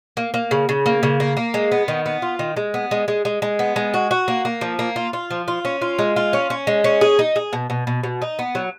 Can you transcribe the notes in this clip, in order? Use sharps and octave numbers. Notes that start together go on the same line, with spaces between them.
A#3
A#3
C#3
C#3
A#3
C#3
A#3
A#3
G#3
B3
D#3
B3
F4
D#3
G#3
B3
G#3
G#3
G#3
G#3
B3
G#3
F#4
F#4
A#3
A#3
F3
A#3
F4
F4
F3
F4
C#4
F4
G#3
F4
C#4
C#4
G#3
C#4
G#4
D#4
G#4
B2
B2
B2
B2
D#4
B3
F#3